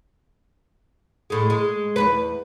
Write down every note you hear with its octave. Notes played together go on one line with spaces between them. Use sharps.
A2 G#3
G#3
E2 G2 B4